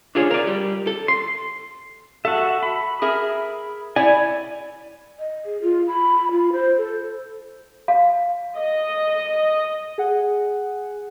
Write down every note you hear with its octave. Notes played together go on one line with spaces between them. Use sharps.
D4 F4 G#4 C#5
A#4 D5
G3
A4
C6
F#4 A4 E5
B5
G#4 A#4 E5
E4 C#5 D5 G#5
D#5
G#4
F4
B5
F4
C5
A4
F5
D#5
G#4 F#5